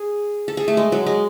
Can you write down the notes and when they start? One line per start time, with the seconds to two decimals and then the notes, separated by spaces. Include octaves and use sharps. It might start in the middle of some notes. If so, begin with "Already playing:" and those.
Already playing: G#4
0.48 A4
0.57 G#4
0.68 A3
0.77 G#3
0.92 F#3
1.06 G#3